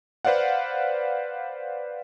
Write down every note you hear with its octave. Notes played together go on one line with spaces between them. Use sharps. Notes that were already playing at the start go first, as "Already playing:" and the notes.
B4 C5 D5 F5 F#5